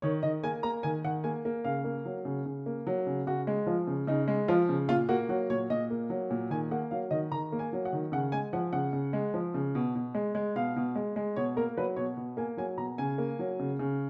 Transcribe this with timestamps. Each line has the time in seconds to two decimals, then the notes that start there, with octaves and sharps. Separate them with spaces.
0.02 D#3 C#5
0.23 D#3 D#5
0.43 A#3 G#5
0.63 A#3 A#5
0.83 D#3 G#5
1.04 D#3 F#5
1.24 A#3 G#5
1.45 A#3
1.64 C#3 F5
1.84 A#3
2.05 F#3
2.25 C#3
2.46 C#3
2.66 A#3
2.87 F#3
3.07 C#3
3.27 C#3 F#4
3.47 G#3
3.67 F3 F4
3.87 C#3
4.07 C#3 D#4
4.28 G#3
4.48 F3 F4
4.69 C#3
4.89 A#2 F4
5.09 A#3 F#4
5.29 F#3 F#4
5.50 A#2 C#5
5.70 A#2 D#5
5.90 A#3
6.10 F#3
6.31 A#2
6.50 D#3 G#5
6.71 A#3 F#5
6.91 F#3 F5
7.11 D#3 D#5
7.32 D#3 A#5
7.52 A#3
7.59 G#5
7.73 F#3
7.85 F#5
7.93 D#3
8.12 C#3 F#5
8.32 G#3 G#5
8.53 F3 F#5
8.73 C#3 F#5
8.93 C#3
9.13 G#3
9.34 F3
9.54 C#3
9.75 B2
9.95 B2
10.15 G#3
10.35 G#3
10.55 B2 F5
10.76 B2
10.95 G#3
11.16 G#3
11.36 B2 C#5
11.57 A#3 A#4
11.77 F#3 B4
11.96 B2 C#5
12.17 B2
12.37 A#3 G#5
12.57 F#3 G#5
12.77 B2 A#5
12.98 C#3 G#5
13.18 A#3
13.39 F#3
13.60 C#3
13.79 C#3